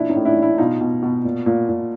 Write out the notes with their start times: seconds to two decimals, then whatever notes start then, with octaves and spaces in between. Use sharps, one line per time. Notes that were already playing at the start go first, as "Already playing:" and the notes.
Already playing: A#2 E3 D4 E4
0.09 C#4 D#4
0.15 A2
0.25 D4 E4
0.36 E3
0.42 D4 E4
0.58 B2 D#4 F4
0.81 B2
1.02 B2
1.24 A#2
1.46 A#2
1.69 A#2